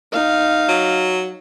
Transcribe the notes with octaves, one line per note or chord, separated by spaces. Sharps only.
D#4 F5
F#3